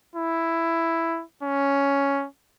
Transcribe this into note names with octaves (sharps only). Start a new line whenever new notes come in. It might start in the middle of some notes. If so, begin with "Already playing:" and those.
E4
C#4